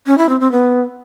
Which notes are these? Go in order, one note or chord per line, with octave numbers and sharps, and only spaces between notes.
C#4
E4
C4
C4
B3